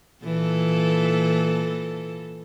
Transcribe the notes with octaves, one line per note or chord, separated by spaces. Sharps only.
A#2 E3 A4